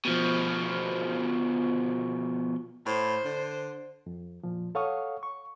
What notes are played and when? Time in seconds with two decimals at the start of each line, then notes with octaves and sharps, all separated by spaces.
0.05 B2 F3
2.86 A2 C5
3.25 D3
4.07 F2
4.44 A#2 F3
4.75 A4 C#5 F5 F#5 C#6 D#6
5.23 C#6